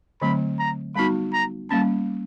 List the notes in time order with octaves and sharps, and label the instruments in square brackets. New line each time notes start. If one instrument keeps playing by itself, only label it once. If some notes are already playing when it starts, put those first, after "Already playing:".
[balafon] D3 F#3 A3 C4 [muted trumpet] B5
[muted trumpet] A#5
[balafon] G3 B3 D#4 F#4 [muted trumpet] B5
[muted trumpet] A#5
[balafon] G3 A#3 C#4 [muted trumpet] A5